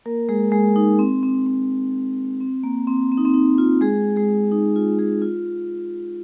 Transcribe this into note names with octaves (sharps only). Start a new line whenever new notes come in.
A#3 A#4
G#3 G#4
G#3 G#4
D#4
C4
C4
C4
C4
A#3
C4
C4
D#4
C4
D#4
F4
G#3 G#4
G#3 G#4
D#4
F4
G#3 G#4
F4